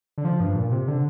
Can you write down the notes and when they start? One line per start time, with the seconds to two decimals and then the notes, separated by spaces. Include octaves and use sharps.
0.18 D3
0.25 F3
0.40 G2
0.56 A#2
0.72 C3
0.88 D3